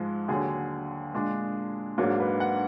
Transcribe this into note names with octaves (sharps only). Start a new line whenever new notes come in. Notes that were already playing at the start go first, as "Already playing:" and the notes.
Already playing: G#2 F3 G#3
D#2 D3 F#3 G#4
A#2 G#3 D4
G#2 F#3 A#3 D4
B4
F#5